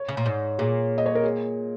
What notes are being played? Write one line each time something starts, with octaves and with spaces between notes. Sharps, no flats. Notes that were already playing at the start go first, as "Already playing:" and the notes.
Already playing: C#5
C#3
A#2
G#2
A#2 G#4
D#5
C#5
A#4
G#4